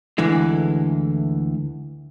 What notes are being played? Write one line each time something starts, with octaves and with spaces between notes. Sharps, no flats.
D2 D3 E3 G#3